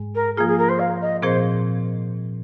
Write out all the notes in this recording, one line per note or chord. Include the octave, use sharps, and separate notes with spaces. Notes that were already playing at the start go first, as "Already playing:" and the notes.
Already playing: G#2 G#3
A#4
F3 A#3 F4 G#4
G#4
A#4
C5
F5
D#5
A#2 F3 C4 G#4 C5